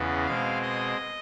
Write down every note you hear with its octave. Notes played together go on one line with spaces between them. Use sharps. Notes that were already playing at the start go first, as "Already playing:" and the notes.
Already playing: E2 C#3 E3 B3
B2 G#3 C4 F5
D#5